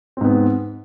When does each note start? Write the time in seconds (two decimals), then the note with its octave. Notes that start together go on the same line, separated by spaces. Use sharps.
0.17 C4
0.21 G#2
0.25 B3